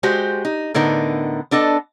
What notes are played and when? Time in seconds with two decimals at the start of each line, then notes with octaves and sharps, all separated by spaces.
0.03 G#3 F#4 G4 C5
0.45 D#4
0.74 A2 D3 B3 D#4 A#4
1.51 B3 D4 A4 D#5